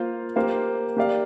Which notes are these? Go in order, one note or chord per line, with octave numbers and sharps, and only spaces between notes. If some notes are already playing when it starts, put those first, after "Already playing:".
Already playing: A#3 F4 C5 F5
A#3 G4 C5 F5
A#3 G4 D5 F5